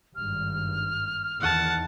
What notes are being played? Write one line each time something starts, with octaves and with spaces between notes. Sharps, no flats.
G#1 G2 F6
E2 D#3 F#5 A5